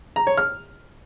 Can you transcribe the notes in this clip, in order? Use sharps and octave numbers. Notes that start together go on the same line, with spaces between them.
A#5
C#5
F6